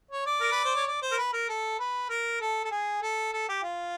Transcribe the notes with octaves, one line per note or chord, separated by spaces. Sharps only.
C#5
D5
A#4
B4
C5
C#5
D5
C5
A#4
B4
A#4
A4
B4
A#4
A4
A4
G#4
A4
A4
G4
F4